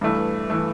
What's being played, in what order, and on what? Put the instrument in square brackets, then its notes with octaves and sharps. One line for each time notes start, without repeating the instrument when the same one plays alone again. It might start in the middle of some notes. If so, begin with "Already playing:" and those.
[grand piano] G2 E3 A3
E3 A3